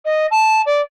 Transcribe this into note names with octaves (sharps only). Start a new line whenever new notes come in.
D#5
A5
D5